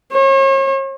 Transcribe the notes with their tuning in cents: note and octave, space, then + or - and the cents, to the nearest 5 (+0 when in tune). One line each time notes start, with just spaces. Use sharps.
C#5 -40